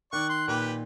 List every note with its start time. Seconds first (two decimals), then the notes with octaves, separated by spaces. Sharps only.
0.13 D#3 D5 C#6 F#6
0.29 C6
0.48 A#2 D#3 G4 B4